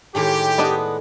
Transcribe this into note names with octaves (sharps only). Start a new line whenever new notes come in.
A2 D#3 G#3 G4
B3 D4 D#5